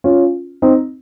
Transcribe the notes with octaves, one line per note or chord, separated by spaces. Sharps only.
C#4 F4
C4 D#4